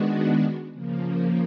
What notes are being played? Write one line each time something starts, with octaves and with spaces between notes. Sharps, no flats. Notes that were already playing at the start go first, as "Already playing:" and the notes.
Already playing: D#3 G#3 B3 D4 F#4
C#3 F3 A#3